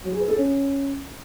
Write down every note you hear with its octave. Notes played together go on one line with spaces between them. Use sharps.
F#3
G#4
B4
A4
C#4